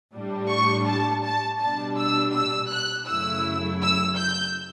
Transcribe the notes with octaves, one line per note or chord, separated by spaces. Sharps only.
A2 G3 D4
C#6
A5
A5
B2 G3 D4 A5
E6
E6
F#6
F#2 C#3 F#3 A3 E4 E6
E6
G6